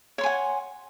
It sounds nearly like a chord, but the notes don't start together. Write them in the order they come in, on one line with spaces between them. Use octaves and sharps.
C#5 C6 G#5 F#5